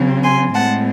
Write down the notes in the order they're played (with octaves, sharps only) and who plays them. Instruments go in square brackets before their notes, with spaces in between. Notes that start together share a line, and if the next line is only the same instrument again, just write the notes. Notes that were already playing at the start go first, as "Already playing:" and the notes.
Already playing: [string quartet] C#3 F#3 C4
G#5 C6
A2 G#3 C4 F#5 A5